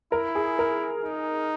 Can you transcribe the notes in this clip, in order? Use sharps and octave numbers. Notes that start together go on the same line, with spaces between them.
E4 A#4
G#4
A#4
D#4